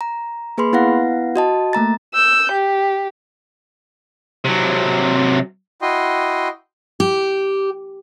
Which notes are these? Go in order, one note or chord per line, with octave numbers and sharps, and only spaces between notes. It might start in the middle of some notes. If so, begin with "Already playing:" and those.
A#5
A#3 G#4 B4 B5 C6
B3 E4 B4 F5 F#5 A#6
F#4 D#5 A5
A3 A#3 A#5 A6
E6 G6
G4
C3 F#3
E4 F#4 D#5 G5 C6
G4